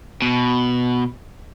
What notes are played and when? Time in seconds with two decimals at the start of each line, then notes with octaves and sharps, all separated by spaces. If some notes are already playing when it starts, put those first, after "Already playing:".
0.22 B2